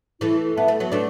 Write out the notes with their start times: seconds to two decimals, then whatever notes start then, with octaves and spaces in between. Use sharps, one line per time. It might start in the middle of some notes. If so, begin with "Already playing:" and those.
0.21 E3 A3 E4
0.57 B3 B4 E5 A5
0.68 A3
0.80 F#3 B3
0.92 A3 D4 B4